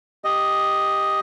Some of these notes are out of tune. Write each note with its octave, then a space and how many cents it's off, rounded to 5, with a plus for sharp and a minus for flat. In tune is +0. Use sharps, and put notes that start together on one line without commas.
G4 +0 D#5 +0